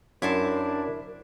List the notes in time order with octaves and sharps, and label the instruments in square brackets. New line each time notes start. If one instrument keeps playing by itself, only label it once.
[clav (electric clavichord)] F#2 [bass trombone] D4 [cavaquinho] E4 C5 A5 [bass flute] A#4